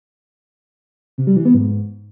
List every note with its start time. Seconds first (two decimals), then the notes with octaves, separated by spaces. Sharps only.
1.18 C3
1.27 G3
1.36 E3
1.45 B3
1.54 G#2